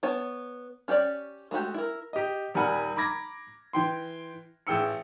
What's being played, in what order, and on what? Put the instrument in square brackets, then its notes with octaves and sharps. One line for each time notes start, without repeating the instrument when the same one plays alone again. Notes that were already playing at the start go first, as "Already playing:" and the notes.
[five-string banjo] B3 C#5 A5
C#4 G4 C#5 D5
G#3 A3 F#4 G4
E4 A#4
[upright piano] G4 D#5
D#1 G3 A#4 F#5 G#5 B5
A#5 B5 D6 G#6 A#6
E3 G5 C6
A1 G#4 G5 E6 C#7